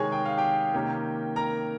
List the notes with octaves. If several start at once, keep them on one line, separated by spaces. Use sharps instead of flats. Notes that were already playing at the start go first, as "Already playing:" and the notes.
Already playing: C3 D#3 G#3 G#4 C#5 G#5 C#6
G5
F5
G4 G5
C3 D#3 A#3 C#4
A#4 A#5